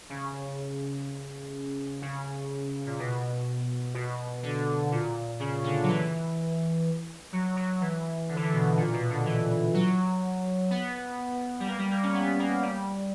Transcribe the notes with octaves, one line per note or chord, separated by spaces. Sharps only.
C#3
C#3
A#2
B2
B2
D3
A#2
C#3
D3
F#3
E3
F#3
F#3
E3
D3
E3
D3
B2
A#2
B2
D3
E3
F#3
B3
G3
A#3
G3
A#3
C#4
B3
A#3
G3